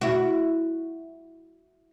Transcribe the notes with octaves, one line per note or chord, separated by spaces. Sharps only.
E4 F#4